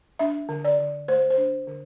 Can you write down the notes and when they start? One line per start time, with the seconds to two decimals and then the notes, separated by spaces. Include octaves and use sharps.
0.19 D4 E5
0.49 D3
0.65 D5
0.79 D3
1.08 A3 C5
1.30 C5
1.38 D4
1.67 D3